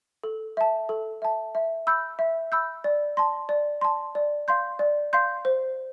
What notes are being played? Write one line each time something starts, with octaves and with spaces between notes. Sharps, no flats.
A4
E5 A5
A4
E5 A5
E5
B5 E6 G6
E5
B5 E6 G6
D5
A5 C6
D5
A5 C6
D5
F5 C6 G6
D5
F5 C6 G6
C5